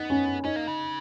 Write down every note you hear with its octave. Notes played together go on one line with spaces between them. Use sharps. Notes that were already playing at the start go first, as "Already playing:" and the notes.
Already playing: B3 D#4
C#4
C#4 D#4
A#3
C#3